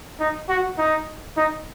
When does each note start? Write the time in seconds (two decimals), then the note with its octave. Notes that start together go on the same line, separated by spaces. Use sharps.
0.20 D#4
0.49 F#4
0.78 D#4
1.37 D#4